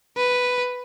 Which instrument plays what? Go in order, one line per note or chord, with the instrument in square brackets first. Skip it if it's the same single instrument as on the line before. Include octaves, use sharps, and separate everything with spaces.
[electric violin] B4